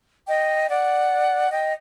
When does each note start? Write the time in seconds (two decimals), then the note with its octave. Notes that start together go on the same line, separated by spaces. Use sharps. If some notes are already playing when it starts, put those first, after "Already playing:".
0.28 D#5 G5
0.69 D5 F#5
1.50 D#5 G5